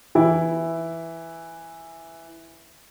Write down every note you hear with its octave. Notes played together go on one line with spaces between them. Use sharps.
E3 E4